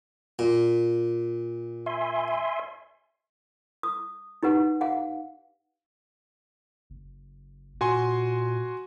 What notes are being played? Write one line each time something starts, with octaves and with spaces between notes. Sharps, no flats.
A#2
E5 G#5 C6
D#6
D#4 G4 B4 F#5
F5 F#5
F#1
A#2 F#4 G#5 C6